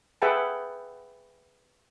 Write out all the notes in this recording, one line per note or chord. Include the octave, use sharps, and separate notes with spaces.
G#4 B4 E5 F#5 G5 A5